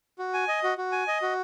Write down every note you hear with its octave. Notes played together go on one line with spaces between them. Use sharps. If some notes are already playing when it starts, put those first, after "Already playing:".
F#4
G#5
D#5
F#4
F#4
G#5
D#5
F#4